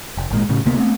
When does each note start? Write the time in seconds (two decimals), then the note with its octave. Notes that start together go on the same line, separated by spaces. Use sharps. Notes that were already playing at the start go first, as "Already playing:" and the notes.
0.17 F1
0.31 G#1 A#2 G#3
0.49 A2 C#3
0.65 D2 C3 A#3 B3
0.78 A3 B3 C4